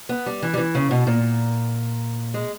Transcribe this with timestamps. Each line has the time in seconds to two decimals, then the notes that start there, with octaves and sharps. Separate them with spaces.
0.09 B3
0.26 G3
0.42 E3
0.54 G3
0.58 E3
0.75 C#3
0.91 B2
1.07 A#2
2.34 G#3